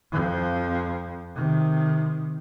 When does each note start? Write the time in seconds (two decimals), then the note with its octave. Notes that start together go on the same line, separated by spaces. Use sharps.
0.12 F2 F3
1.36 C3 D#3